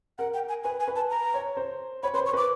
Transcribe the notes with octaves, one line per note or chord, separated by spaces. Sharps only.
A#4 F#5
G5
G#5
B4 G#5
G#5
B4
A5
A#5
C#5
C5
C#5 B5
B4 C6
C5
C#6
B4 D6